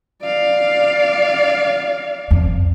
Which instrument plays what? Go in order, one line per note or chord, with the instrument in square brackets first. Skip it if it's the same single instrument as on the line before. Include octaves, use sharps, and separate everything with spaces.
[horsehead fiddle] D5 F5
[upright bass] F2